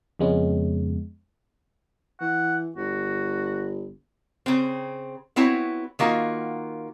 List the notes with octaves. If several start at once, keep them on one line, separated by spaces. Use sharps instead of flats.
F2 C#3 G#3 B3 C#4
E3 F#5
G1 F#4
C#3 C4
B3 C4 E4 F#4 C#5
D#3 A#3 F4 F#4